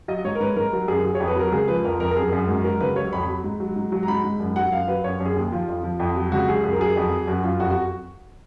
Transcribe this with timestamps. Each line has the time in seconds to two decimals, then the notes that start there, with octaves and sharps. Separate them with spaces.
0.08 F#3 D#5
0.24 G#2 C#5
0.35 A#4
0.40 G#2 B4
0.56 G#2 A#4
0.73 F#3
0.88 F#2 G#4
1.04 F#3
1.15 C#5
1.20 F2
1.27 B4
1.36 F#3 A#4
1.52 C#2 G#4
1.68 F3 B4
1.84 F2 A#4
2.00 F2 A#4
2.11 A#4
2.17 F#2 G#4
2.33 F#2
2.48 G#2 F#4
2.64 F#3 A#4
2.80 C#2 B4
2.96 F#3 C#5
3.13 F2 B5
3.23 F#3 B5
3.44 G#2
3.60 F#3
3.76 G#2
3.92 F#3
4.03 A#5
4.08 G#2 B5
4.24 G#2
4.40 F#2
4.56 F#3 F#5
4.72 F#2 F5
4.88 F#3 B4
5.04 F#2 C#5
5.20 F#2
5.26 G#4
5.36 D#2
5.52 F3 F4
5.68 F2
5.84 F3
6.00 F2
6.16 F#3
6.32 C#2 F#4
6.48 F#3 G#4
6.63 F#2 G#4
6.72 A#4
6.79 F#3 G#4
6.96 F2
7.12 F#3
7.27 F#2 F#4
7.44 F#2 F4
7.59 F2 F#4
7.70 F#4